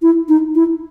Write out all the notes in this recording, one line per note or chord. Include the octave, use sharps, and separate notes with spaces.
E4
D#4
E4